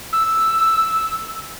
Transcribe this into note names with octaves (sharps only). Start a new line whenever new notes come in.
E6